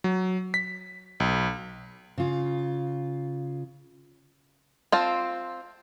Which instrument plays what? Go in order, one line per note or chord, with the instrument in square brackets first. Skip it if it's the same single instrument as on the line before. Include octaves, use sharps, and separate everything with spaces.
[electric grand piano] F#3
B6
B1
[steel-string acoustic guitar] C#3 F4
[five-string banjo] C4 F4 A5